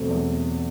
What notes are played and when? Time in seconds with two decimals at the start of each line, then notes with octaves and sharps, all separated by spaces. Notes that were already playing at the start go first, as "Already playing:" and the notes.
Already playing: E2 B2 F#3 A3 C4
0.10 E2